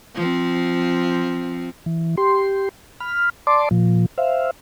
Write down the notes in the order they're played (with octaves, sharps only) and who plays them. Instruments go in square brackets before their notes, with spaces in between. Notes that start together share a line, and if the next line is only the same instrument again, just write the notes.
[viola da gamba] F3 C4
[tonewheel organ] E3
G4 C6
B5 F6
D5 A5 C6 D6
A#2 F3
C5 E5 F5